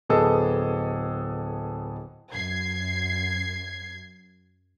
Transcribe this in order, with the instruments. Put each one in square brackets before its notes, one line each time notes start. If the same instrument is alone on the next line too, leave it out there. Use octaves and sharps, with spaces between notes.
[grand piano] D1 B3 G#4 A4 D#5 E6
[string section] F#2 G#6 C7